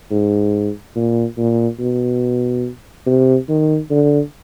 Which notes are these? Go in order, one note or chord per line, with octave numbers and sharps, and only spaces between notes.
G#2
A#2
A#2
B2
C3
D#3
D3